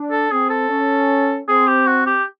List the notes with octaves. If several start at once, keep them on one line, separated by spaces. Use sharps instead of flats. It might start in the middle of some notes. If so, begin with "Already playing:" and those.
Already playing: D4
A4
C4 G#4
A4
C#4
C4 G#4
G4
F#4
G4